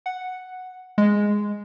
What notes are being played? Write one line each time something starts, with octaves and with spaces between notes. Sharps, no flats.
F#5
G#3